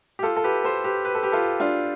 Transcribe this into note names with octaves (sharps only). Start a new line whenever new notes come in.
G4
F4 A4
A4
G4 B4
A4 C5
G4 B4
B4
A4
G4 B4
F4 A4
D4 F4